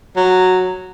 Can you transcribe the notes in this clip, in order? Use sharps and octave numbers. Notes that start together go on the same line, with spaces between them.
F#3